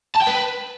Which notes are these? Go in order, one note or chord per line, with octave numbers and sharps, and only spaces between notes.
A5
G5
B4